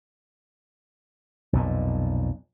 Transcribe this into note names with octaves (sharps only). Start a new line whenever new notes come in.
B1 F2 A#2